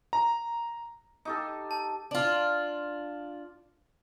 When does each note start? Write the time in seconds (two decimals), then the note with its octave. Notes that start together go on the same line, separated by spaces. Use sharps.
0.13 A#5
1.25 D#4 G4 A4
1.71 A5
2.11 D4 F4